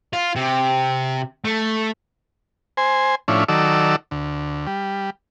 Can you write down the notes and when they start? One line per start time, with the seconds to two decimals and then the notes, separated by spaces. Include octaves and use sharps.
0.13 F4
0.36 C3
1.45 A3
2.77 C5 G#5
3.28 A2 F3 C#4 D4 E4
3.48 D#3 F#3 A4 D5 E6
4.11 D2
4.67 G3